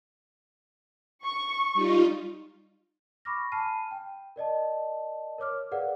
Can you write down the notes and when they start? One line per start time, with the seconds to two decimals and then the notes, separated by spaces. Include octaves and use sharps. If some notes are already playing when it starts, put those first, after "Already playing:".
1.24 C#6
1.74 G3 D#4 F4
3.25 B5 C#6 D6 F6 A#6
3.52 G#5 A5 B5 F6 C7 D#7
3.91 G5
4.36 A#4 D5 D#5 A5
5.38 A#4 C#5 D6 F6
5.72 G#4 A#4 B4 D5 F5 F#5